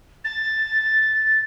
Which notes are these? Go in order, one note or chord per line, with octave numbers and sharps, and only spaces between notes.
A6